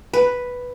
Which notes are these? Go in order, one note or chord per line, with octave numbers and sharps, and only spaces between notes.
B4